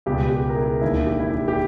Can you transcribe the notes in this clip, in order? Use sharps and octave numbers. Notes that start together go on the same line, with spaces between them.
C#2 B2 G3 B3 G4
G4
A#4
E4 G#4
E1 D#2 D#3 E4
G4
E4
G4
G4